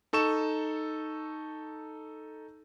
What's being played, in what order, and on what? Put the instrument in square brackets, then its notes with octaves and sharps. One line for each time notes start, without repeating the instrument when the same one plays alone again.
[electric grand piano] D#4 A4 C#6 E7